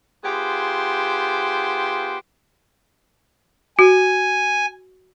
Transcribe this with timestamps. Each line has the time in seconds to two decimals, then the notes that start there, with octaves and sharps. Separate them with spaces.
0.24 B3 F4 G4 G#4 C5
3.79 F#4 G#5